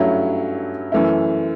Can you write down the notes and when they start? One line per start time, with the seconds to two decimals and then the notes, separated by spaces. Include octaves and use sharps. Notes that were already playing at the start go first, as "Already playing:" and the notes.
Already playing: G2 F#3 A3 C#4 E4
0.92 F#2 E3 A3 E4